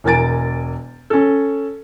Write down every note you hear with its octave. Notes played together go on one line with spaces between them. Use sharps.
E1 E3 A#4 G#5 A6 D7
C#4 A4